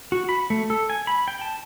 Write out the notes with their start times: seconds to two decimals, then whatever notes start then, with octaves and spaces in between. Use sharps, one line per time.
0.12 F#4
0.29 B5
0.50 A3
0.70 A4
0.90 G#5
1.07 B5
1.28 G5
1.41 A5